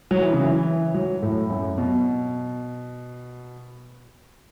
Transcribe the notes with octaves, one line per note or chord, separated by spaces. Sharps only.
F#3
E3
C#3
E3
F#3
A2
F#2
B2